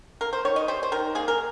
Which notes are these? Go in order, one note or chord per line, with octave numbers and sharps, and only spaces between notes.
A#3 A#4
C5
D#3 C#5
D#5
G3 C5
C5
D#3 A#4
A#3 G#4
A#4